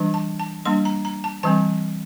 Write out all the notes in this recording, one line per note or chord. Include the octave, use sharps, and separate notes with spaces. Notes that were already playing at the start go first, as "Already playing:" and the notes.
Already playing: E3 G3 D4
A5
A5
G3 A#3 D4 C6
A#5
A#5
A5
E3 G3 C4 A5